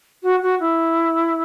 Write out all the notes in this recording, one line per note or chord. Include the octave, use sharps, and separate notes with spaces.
F#4
F#4
E4